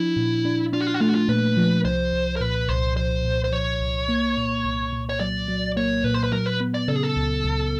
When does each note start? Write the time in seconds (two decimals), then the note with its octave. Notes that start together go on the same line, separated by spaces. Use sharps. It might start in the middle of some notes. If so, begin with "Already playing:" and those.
Already playing: F3 D4 E4
0.16 A#2
0.45 D4
0.73 D4 F4
0.80 F#4
0.87 F4
0.94 F#4
1.01 A3 F4
1.09 F#4
1.15 F4
1.29 A#2 B4
1.57 F3
1.85 C2 C5
2.13 C2
2.36 A#4
2.41 A#2 B4
2.69 C2 C5
2.96 F3 C5
3.25 A#2
3.44 C5
3.52 F3 C#5
3.81 C2
4.09 A#3
4.37 A#2
4.64 C2
4.93 A#2
5.09 C#5
5.20 F#3 D5
5.48 F#3
5.77 A#3 C#5
6.04 A#2 B4
6.14 C5
6.24 B4
6.32 F#3 A#4
6.46 B4
6.60 B3
6.74 D5
6.88 C#3 A4
6.95 G#4
7.03 A4
7.16 C#2
7.44 C#2